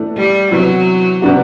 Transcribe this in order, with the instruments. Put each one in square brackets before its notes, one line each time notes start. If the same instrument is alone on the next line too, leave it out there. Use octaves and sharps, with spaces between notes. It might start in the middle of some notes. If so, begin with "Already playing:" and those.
Already playing: [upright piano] A2 E3 A3 D4
[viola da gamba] G3
[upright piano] C3 E3 B3 E4 [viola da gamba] F#3
[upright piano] C3 G3 B3 D4 F#4